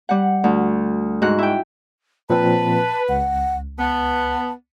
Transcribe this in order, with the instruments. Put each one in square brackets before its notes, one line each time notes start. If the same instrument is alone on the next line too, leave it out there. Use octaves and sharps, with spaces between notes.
[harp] G3 F#5
D2
G#2 F#4 F#6
E4 G5
[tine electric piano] A#2 F3 C4 [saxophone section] B4 [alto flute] A5
[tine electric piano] C#2 [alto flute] F#5
[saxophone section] B3 [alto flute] A5